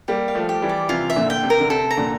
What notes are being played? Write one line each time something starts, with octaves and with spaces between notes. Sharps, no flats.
G3 A#3 G4
F5
F3 A3
G4
E3 G3
D5
C3 E3 F4
E5
A#2 D3
G5
C3
A#4
D3
C3 A4
A#5
A#2 D3